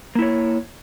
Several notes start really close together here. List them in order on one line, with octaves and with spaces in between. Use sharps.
A#3 E4 C#5